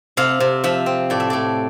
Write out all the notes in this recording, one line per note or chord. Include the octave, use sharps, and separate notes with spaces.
C3 F5
C3
F3 E5
C4
A2 D5
E5
A2 D5